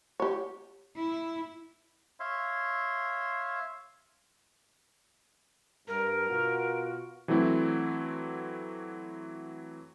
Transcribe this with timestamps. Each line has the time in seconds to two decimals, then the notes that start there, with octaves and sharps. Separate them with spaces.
0.20 G4 C#5
0.97 E4
2.20 C#5 E5 F5 C6
5.88 G2 A#4
6.30 B2 F4 F#4
7.28 E3 F#3 A3 C4 E4